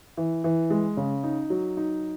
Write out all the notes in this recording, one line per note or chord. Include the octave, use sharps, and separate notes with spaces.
E3
E3
G#3
C#3
D#4
F#3
D#4